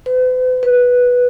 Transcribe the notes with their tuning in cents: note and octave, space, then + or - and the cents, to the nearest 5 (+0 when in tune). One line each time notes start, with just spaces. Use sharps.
B4 +45
B4 -5